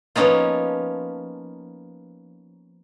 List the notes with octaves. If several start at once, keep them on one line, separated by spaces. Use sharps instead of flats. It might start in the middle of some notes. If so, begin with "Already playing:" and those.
F3 A#3 B3 C#4 D#4 F4